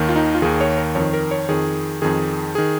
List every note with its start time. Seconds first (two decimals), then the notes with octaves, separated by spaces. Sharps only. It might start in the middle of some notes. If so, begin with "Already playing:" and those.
Already playing: D#2 D#3
0.09 F4
0.16 D#4
0.35 F4
0.42 D#2 D#3 G#4
0.61 C#5
0.78 A#4
0.95 F2 D#3 C#5
1.13 A#4
1.31 C#5
1.49 F2 D#3 G#4
2.02 F2 D#3 G#4
2.55 D#3 G#4